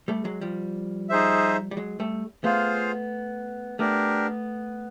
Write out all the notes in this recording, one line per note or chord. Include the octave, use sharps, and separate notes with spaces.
G3 A3
F#3 G#3
F3 G3
D#4 G#4 C5 E5
G3
F#3 G#3
G3 A3
A3 B3 F4 G#4 C5 F5
A3 B3 D4 G4 A#4